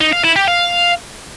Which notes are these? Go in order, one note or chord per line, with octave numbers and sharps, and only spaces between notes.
D#4
F5
E4
G4
F5